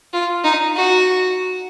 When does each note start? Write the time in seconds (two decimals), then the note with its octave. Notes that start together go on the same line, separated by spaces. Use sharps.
0.14 F4
0.44 D#4
0.76 F#4